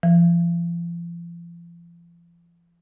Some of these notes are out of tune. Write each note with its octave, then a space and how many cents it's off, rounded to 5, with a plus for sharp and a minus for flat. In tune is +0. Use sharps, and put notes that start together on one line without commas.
F3 -40